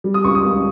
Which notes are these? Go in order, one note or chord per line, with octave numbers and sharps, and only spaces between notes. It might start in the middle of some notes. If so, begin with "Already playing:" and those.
G3
D#6
C#2 C#6
D#6
C#2